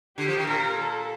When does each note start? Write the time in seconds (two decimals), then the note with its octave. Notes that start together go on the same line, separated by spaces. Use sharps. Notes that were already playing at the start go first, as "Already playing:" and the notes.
0.18 D3 G4
0.28 F3
0.38 D#3
0.46 A#2 A#4
0.76 A4